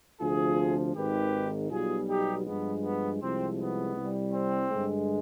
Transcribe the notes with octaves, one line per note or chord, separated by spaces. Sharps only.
D2 C3 F3 F4 G#4
G#1 G#2 D#3 G#3 G4 B4
B1 B2 G3 F4 G#4
D#4 G4
G2 F3 G#3 B3
B3
C2 C3 F3 G#3 C4
B3
C2 C3 G3
C4
G2 D3 G#3